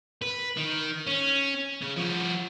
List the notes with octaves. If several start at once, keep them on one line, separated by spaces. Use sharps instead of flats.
B4
D#3
C#4
C#3
F3 F#4